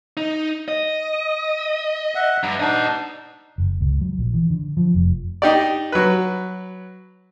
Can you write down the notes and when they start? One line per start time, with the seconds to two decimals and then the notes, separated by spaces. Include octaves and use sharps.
0.17 D#4
0.68 D#5
2.15 E5 F#5
2.43 G2 A#5
2.60 D4 D#4 D#5 F#5
3.58 F#1
3.81 C#2
4.01 F#3
4.19 A#1
4.34 E3
4.50 D3
4.77 F3
4.94 F1
5.42 D#4 G4 D5
5.92 F#3 B4